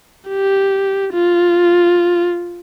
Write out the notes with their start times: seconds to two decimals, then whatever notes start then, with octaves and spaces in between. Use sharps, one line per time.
0.29 G4
1.13 F4